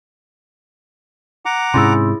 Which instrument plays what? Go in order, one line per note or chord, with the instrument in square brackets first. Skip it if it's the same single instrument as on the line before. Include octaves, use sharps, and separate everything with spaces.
[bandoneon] F#5 A#5 D6
[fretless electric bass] G#2 C3 [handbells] C#4 E4 G#4 [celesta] C6 E6